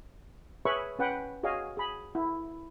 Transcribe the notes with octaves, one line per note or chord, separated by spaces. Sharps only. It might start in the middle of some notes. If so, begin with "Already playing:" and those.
G#4 B4 C#5 E5 B5 C#6
C#4 B4 F#5 G5
F#4 G#4 C#5 D#5 F5 G#5
G#4 B5
E4